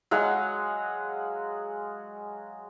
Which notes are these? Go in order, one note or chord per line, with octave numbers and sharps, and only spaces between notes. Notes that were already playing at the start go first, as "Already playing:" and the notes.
F#3 G#3 F5 F#5